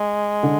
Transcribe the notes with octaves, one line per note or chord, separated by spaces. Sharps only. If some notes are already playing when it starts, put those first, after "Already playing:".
Already playing: G#3
D3